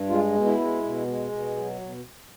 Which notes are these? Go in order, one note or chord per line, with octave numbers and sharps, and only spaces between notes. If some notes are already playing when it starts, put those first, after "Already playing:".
Already playing: G2
G#3 F4
B2
E4
G#3
B2
G#3
B2
F#3
B2